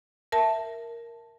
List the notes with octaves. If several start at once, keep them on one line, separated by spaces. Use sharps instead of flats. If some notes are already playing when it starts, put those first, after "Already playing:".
A#4 E5 A5